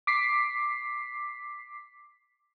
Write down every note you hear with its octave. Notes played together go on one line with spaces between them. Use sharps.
D6 B6 C7